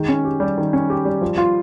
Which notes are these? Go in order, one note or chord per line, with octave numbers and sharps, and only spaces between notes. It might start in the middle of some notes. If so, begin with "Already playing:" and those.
Already playing: D#3 G#3
C#4
G4
G3
D#3
C#4
G4
G3
F3
F4